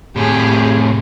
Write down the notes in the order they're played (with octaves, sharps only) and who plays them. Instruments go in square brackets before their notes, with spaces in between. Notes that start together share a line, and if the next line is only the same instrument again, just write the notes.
[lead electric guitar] A2 C3 [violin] G4 G#4